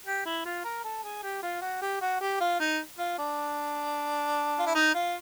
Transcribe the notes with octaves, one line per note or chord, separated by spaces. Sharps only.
G4
E4
F4
A#4
A4
G#4
G4
F4
F#4
G4
F#4
G4
F4
D#4
F4
D4
F4
E4
D#4
F4